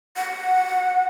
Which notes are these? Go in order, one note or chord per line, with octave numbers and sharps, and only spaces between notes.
F#5